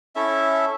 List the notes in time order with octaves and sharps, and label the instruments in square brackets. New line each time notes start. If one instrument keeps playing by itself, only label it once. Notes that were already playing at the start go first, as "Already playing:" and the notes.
[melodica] C#4 E4 A4 E5